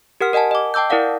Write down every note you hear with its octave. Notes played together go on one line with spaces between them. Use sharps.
G4 A#4 F#5 F6
A#4 D#5 F#5 G#5 A5
D#5 D6
G5 A5 D6 E6 G6
E4 A#4 D5 F5 F#5